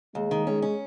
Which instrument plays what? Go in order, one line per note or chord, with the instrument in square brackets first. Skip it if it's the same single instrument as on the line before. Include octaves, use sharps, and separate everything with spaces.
[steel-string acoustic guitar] D#2 [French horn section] G#3
[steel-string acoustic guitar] D#3
[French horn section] G#3 [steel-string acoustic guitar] C#4
[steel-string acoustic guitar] C#4